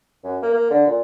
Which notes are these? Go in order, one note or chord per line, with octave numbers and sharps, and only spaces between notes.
F#2
A#3
A#3
D3
A#2